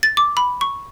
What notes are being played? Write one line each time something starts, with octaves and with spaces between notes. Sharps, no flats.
A6
D6
B5
C#6